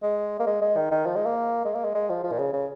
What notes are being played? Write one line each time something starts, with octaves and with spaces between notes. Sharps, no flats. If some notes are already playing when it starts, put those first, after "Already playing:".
G#3
A#3
G#3
G#3
D#3
D#3
F3
G#3
A#3
G#3
A#3
G#3
G#3
F3
F3
A#2
C#3
C#3